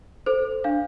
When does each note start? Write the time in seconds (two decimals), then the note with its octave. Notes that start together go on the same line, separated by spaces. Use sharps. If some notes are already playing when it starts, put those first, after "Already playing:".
0.26 A4 C5
0.64 D4 F5